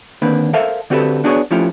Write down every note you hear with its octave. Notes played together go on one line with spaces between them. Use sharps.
D#2 D3 A#3 C4 D4 B4
A4 A#4 C5 E5 F5 A5
D3 C4 F#4 G4 A4 B4
B3 D4 F#4 G#4 A4 C#5
F3 A3 C#4 E4 F4 G4